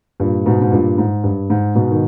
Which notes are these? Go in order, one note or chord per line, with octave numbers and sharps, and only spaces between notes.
G2 A#2
A#2
G#2 B2
G#2
G2 A#2
G#2
G2
G#2
G#2 B2
D#3